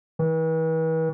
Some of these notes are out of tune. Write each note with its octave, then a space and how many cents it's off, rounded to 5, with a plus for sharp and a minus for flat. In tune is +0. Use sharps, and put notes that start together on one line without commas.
E3 -40